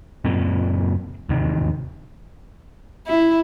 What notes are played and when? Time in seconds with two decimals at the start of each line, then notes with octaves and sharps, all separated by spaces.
0.25 F#1 F#2 A#2 C4
1.29 E1 D#2 C3 D#3
3.07 E4